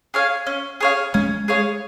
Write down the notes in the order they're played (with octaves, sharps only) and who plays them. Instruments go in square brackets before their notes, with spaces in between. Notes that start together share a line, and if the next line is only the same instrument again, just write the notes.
[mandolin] G#4 C#5 F5
C#4
G#4 C#5 F5
[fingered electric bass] G#3 [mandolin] C#4
[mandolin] G#4 C#5 F5